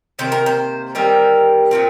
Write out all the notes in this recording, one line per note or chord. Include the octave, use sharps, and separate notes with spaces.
C3 D#3 A#3 C5
A#4
C5
D#3 G3 C4 A#4
A#2 F3 C4